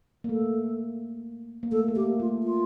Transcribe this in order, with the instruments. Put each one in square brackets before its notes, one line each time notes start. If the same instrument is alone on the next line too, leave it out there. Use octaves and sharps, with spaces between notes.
[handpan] A#3
[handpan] A3 [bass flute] A4
[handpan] A#3
[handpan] A3 [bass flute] A4
[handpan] A3
[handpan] A#3 [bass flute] G4
[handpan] A3 [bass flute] F4
[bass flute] F4